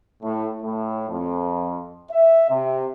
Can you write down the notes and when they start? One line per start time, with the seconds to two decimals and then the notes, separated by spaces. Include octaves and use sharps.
0.23 A2
0.63 A2
1.09 F2
2.11 E5
2.50 C3